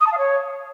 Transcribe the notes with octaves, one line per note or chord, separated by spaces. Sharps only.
D#6
A5
F5
C#5